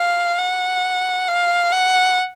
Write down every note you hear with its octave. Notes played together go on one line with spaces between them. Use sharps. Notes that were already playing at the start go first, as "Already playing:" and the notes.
Already playing: F5
F#5
F5
F#5